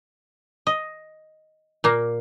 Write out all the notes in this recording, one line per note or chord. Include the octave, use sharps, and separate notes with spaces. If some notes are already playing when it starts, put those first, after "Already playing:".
D#5
A#2 A#3